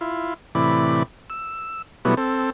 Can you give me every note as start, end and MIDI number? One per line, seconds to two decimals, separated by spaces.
0.01 0.34 64
0.01 0.34 65
0.55 1.03 45
0.55 1.03 48
0.55 1.03 52
0.55 1.03 74
0.55 1.03 83
1.30 1.82 88
2.05 2.15 47
2.05 2.15 54
2.05 2.15 55
2.05 2.15 57
2.05 2.15 59
2.05 2.15 64
2.17 2.50 60
2.17 2.50 69